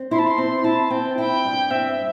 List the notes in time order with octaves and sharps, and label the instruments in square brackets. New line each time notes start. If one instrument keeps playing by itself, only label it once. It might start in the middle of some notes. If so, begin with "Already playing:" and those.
Already playing: [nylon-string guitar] C4
[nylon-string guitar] E4 [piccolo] C6
[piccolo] A5
C6
[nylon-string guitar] C4
[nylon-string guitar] E4 [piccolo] A5
[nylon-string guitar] C4 [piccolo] G5
[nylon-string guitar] E4 [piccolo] G5
[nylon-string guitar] G2
[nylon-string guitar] C4 [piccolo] E5